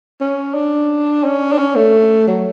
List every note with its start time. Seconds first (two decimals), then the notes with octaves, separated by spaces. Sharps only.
0.21 C#4
0.54 D4
1.24 C#4
1.52 D4
1.58 C#4
1.76 A3
2.28 F#3